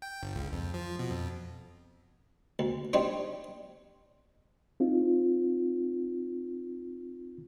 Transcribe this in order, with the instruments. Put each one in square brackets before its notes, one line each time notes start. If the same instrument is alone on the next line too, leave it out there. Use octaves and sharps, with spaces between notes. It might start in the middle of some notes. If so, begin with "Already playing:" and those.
[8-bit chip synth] G5
G1
C#2
F2
F3
B2
F2
[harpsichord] D2
G3 C4 D4 D#4 C#5
[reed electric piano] C4 D#4 F4